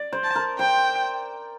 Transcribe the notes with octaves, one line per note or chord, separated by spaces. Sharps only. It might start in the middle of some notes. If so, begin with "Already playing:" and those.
Already playing: D5
C5
A5
A#4
C5 G5